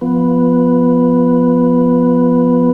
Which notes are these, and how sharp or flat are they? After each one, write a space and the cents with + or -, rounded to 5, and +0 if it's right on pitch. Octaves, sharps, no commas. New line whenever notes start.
F3 +0 B3 +0